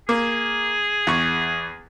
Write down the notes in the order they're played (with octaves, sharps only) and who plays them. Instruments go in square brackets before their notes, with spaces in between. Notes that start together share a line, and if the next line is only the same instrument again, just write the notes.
[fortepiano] A#3 [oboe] G#4
[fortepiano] E2 C#6